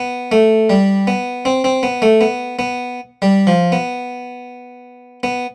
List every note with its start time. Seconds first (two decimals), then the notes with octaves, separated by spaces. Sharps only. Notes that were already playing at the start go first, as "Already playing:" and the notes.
Already playing: B3
0.32 A3
0.70 G3
1.07 B3
1.45 C4
1.64 C4
1.83 B3
2.02 A3
2.21 B3
2.59 B3
3.22 G3
3.47 F3
3.72 B3
5.23 B3